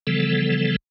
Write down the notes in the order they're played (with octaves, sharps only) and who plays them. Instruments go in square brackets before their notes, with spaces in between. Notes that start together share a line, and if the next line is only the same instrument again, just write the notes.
[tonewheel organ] C#3 E3 F3 G3 B3 A4